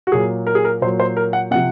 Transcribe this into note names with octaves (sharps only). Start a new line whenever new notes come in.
F#4
A#2 F#3 G#4
A#4
G#4
A#4
A#2 F#3 C5
C5
A#4
F#5
C3 F3 F#5